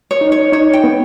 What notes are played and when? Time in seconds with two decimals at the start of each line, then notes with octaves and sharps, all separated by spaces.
0.11 C#5
0.21 D#4
0.32 C#5
0.52 D#4 C#5
0.73 G5
0.84 B3